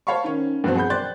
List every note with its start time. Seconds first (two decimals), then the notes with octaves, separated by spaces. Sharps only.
0.07 C5 C#5 F5 A5 B5 C#6
0.24 D#3 C#4
0.64 G2 B2 F3 F#3 C4
0.75 G#4 F#5 B5 G6
0.90 C5 D5 G5 C6 F#6 A6